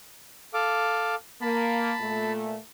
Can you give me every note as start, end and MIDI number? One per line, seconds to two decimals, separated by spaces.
0.54 1.15 69
0.54 1.15 77
0.54 1.15 86
1.41 1.92 58
1.41 2.33 81
1.41 2.33 83
2.00 2.57 46
2.00 2.57 57